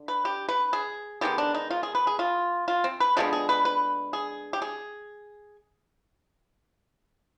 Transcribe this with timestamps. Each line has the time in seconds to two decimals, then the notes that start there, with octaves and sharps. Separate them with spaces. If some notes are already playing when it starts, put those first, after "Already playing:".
Already playing: D3
0.08 B4
0.25 G4
0.49 B4
0.73 G#4
1.21 D#3 G#3 B3 G4
1.38 D4
1.55 D#4
1.71 F4
1.83 G#4
1.95 B4
2.07 G#4
2.19 F4
2.68 F4
2.84 C4
3.00 B4
3.17 D3 F3 G#3 B3 G#4
3.33 G#4
3.49 B4
3.65 B4
4.13 G#4
4.53 G4
4.62 G#4